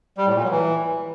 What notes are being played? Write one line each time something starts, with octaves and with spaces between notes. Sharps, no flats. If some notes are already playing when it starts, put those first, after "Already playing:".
G3
A2
A#2
F#3
E3